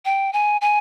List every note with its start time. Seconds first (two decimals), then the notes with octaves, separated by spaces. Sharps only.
0.05 G5
0.33 G#5
0.61 G#5